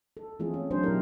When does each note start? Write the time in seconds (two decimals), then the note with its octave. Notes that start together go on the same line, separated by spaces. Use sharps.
0.17 A4
0.39 E3 A3 C4 F4 G#4
0.54 C#4
0.71 F#3 C4 D4 C5
0.84 B2 F#3 D#4 E4 G4 A#4